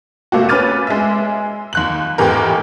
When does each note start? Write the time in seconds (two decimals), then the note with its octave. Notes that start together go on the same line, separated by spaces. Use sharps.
0.32 C3 A3 A#3 F#4
0.49 C#4 B4 D6 F6 A6 D#7
0.87 G#3 E5
1.73 D#2 F#6 F#7
2.18 G#1 E2 A2 E3 G4 A#4